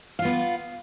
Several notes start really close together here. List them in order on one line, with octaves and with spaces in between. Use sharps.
F5 F4 B3